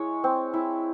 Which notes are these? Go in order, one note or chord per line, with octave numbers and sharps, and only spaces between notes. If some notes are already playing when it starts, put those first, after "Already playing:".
Already playing: G#3 E4 C#5
C4
E4